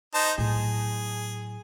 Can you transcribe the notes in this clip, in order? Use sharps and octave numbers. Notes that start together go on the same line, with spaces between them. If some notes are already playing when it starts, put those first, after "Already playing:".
D#4 C5 A5
A2 F#3 G#4